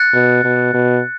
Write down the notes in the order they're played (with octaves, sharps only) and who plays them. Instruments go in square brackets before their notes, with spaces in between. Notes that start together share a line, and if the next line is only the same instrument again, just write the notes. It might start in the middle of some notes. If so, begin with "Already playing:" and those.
Already playing: [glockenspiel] F#6 A6 C#7
[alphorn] B2
B2
B2